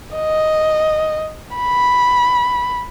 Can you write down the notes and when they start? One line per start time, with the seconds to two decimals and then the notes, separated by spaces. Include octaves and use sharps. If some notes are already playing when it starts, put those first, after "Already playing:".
0.15 D#5
1.56 B5